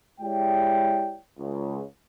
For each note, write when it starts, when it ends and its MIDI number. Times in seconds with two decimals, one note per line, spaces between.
0.21 1.16 56
0.21 1.16 64
0.21 1.16 67
0.21 1.16 73
0.21 1.16 74
0.21 1.16 79
1.38 1.80 37